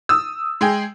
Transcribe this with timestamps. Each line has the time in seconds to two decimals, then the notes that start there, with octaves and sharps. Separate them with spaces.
0.09 D#6 E6
0.61 G#3 G#4 G5